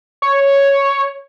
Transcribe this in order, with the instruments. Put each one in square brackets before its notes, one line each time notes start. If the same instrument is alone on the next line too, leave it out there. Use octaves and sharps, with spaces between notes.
[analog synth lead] C#5